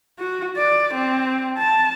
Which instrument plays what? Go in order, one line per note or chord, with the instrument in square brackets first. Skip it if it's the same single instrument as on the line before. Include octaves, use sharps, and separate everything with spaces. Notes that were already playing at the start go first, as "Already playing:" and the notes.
[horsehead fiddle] F#4
D5
C4
A5